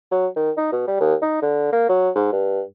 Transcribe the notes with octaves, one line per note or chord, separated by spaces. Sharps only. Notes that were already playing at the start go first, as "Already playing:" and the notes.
F#3
D#3
D#4
B2
G3
D#2
D#4
D3
A#3
F#3
G#2
G2